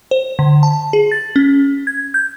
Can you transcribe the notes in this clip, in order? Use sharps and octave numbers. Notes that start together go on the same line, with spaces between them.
C5
D3
A5
G#4
A6
C#4
G#6
G6